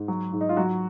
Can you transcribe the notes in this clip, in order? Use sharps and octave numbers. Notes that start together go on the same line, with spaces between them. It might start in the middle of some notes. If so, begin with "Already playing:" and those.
Already playing: G#2
F#3
G#2
D#4
F4
F#3 F#4